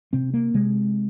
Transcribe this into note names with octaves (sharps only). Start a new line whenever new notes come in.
C3 C4
A#3
C3 G#3